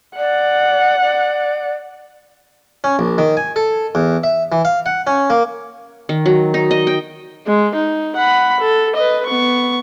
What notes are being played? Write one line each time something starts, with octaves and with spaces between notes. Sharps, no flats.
D5 F#5
D5
C#4
A#1
D#3
G#5
A4
E2
E5
E3
F5
F#5
C#4
A#3
D#3
F#3
D#4
D#5
G5
G#3
D#4
F#5 B5
A4
B4 D#5
B3 C#6